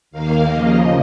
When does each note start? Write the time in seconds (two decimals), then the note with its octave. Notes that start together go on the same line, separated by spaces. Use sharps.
0.11 D#2 D#3 A#3 F5
0.50 D#2 C#3 F3 A#3 D#5